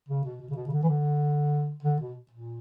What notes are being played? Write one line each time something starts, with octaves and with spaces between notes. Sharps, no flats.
C#3
B2
B2
C#3
B2
C#3
D3
E3
D3
D3
B2
A#2